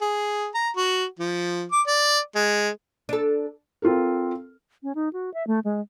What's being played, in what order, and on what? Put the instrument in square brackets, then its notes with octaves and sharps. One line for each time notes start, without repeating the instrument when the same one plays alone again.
[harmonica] G#4
A#5
F#4
F3
D6
D5
G#3
[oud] D4 A4
[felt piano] C4 F4 A4 A#4
[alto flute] C#4
D#4
F#4
E5
A3
G#3